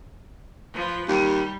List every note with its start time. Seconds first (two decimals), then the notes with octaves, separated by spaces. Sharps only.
0.74 F3 B4
1.08 D#2 G3